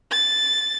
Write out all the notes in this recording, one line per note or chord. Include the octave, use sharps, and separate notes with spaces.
A6